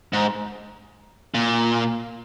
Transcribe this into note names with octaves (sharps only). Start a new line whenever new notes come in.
G#2
A#2